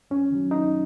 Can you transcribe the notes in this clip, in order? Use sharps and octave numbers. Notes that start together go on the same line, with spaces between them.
F#2 C#4
D#3 F#3
F#2 D#4